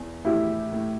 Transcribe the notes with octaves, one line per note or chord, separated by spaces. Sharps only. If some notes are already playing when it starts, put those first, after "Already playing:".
Already playing: E2
A2 E4 G4
A2